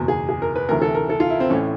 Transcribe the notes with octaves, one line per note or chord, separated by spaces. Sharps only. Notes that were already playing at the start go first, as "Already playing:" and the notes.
Already playing: F#1 E2 B2
G#4
G#4
A#4
B4
D2 C3 E3 A#4
A4
A#4
A4
F4
E4
C4
A1 A2 E3 C#4